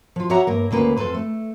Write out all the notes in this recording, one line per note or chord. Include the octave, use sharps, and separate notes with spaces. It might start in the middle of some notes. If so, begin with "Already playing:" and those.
F3 F4
F#4 G4 C#5 E5 F#5 A#5
G2 A#3 A#4
D2 C#3 A#3 B4
F2 C3 A4 B4 C5
A3